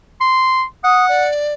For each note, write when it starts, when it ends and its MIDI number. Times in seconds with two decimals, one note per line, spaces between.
0.21 0.64 84
0.84 1.27 78
0.84 1.06 87
1.09 1.54 74